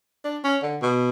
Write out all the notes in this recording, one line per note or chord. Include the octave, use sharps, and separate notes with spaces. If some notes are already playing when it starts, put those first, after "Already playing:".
D4
C#4
D3
B2